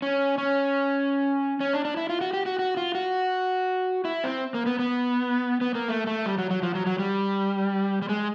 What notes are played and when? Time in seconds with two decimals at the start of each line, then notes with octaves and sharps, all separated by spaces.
0.02 C#4
0.38 C#4
1.60 C#4
1.73 D4
1.85 D4
1.97 E4
2.10 F4
2.21 F#4
2.33 G4
2.46 F#4
2.59 F#4
2.77 F4
2.95 F#4
4.05 E4
4.24 C4
4.54 A#3
4.66 B3
4.79 B3
5.61 B3
5.75 A#3
5.88 A3
6.07 A3
6.26 G3
6.38 F#3
6.51 F#3
6.63 F3
6.75 F#3
6.86 F#3
6.99 G3
8.02 G3
8.09 G#3